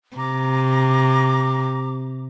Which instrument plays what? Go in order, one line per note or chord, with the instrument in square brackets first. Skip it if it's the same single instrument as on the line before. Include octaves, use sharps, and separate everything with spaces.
[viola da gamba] C3 [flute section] A#5 D6